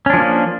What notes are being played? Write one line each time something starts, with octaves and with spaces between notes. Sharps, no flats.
F3 A#3 C#4 D4